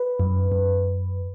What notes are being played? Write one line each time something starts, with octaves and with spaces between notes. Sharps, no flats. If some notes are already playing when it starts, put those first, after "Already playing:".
Already playing: B4
F#2
F#2